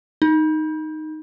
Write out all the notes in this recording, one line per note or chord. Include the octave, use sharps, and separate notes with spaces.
D#4